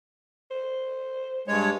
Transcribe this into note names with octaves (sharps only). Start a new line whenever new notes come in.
C5
G2 G#3 C#5